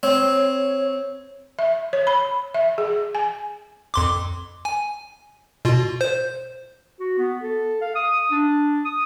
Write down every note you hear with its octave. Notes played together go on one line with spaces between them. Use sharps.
C4 C#5
E5
C#5
B5
E5
G#4
G#5
F2 C6 D6
G#5
B2 F4
C5
F#4
B3
A4
F5
D#6
D4
D#6